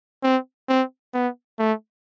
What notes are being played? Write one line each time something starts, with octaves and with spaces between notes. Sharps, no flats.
C4
C4
B3
A3